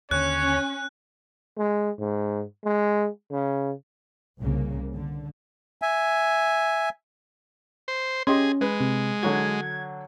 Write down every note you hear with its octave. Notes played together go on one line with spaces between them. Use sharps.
D#2 D3 C#4 C#5 F#6
G#3
G#2
G#3
C#3
C2 C#3 A#3
D3
E5 G#5
C5
C#4 G4 G#4 D#5 C6
G#3 B4
C3
D3 F#3 F#4 G#6